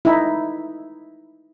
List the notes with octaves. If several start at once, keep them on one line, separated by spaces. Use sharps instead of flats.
D#4 E4